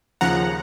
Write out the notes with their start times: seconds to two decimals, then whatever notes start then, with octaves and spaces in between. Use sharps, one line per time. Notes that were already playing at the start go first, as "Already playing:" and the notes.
0.21 D#2 C#3 F3 F#5 A#5